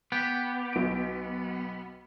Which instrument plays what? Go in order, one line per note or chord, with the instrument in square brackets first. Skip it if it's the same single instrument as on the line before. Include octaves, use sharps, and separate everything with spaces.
[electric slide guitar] B3 [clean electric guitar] G4
[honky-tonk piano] B1 D7